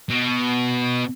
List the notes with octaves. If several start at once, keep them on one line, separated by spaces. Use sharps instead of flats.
B2